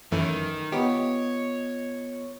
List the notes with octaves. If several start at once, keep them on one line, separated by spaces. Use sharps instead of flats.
F#2 D#3 E3 A3
B3 F4 G4 C#5 D#5